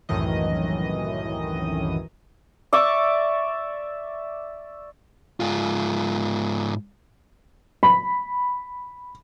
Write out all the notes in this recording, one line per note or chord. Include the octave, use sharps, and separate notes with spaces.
C2 F#2 A2 D#3 E3 D#5
D5 E5 C#6 D6
G#2 F4
B5